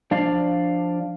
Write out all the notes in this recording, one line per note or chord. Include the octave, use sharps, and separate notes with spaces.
F3 D4 D5 F5